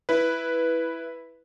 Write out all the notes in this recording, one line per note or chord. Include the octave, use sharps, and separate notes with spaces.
E4 B4